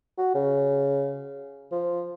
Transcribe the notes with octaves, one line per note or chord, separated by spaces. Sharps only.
F#4
C#3
F3